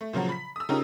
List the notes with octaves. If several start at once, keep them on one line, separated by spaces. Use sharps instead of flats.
A3
A#2 C#3 F3 F#3
B5 B6
D#6 E6
C#3 C#4 D#4 F4 G4 A#4